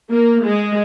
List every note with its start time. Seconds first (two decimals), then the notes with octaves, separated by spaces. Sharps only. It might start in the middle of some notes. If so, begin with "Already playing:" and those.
0.11 A#3
0.44 G#3